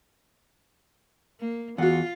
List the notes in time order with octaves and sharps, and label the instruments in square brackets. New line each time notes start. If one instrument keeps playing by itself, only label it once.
[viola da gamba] A#3
[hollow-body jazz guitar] E2 [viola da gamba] F4 [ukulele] F#4 F#5